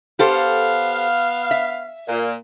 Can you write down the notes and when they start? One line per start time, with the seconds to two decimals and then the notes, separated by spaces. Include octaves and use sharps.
0.19 B3 G4 A4 C5 F5
1.51 E5
2.08 A#2